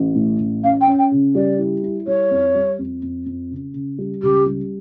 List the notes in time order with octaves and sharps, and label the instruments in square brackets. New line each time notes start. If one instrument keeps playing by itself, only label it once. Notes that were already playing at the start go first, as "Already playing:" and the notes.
Already playing: [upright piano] A1
A2
A1
[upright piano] C#4 [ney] F5
[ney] G5
[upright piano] C#4
[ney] G5
[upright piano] C#3
[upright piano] G3 [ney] D5
[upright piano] E4
E4
[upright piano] G3 [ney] C#5
[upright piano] F2
G3
F2
F2
F2
C#3
C#3
G3
[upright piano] C#2 [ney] G4
[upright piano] G3